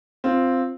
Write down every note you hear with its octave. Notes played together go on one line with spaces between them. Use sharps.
C4 F4